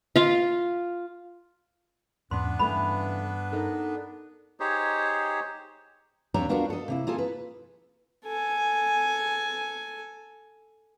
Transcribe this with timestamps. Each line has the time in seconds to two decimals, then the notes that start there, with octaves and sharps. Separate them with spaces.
0.16 F4 F5
2.31 E2 G#2 B3 C#4 D4 B4 C6
2.59 G2 C#3 E3 A3 B5
3.52 D#4 A4 A#4
4.60 D#4 G4 G#4 C5 C#5
6.34 D#2 C4 D4 B4 C#5 A#5
6.49 B3 D4 F4 F#4 A#4
6.70 A4 D#5
6.88 C3 A#3 E4
7.07 A#3 F4 G#4 A4
7.18 B4
8.26 A4 G#5